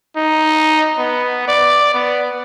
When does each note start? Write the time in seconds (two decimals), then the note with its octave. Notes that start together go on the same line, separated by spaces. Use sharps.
0.16 D#4
0.98 B3
1.48 D5
1.94 B3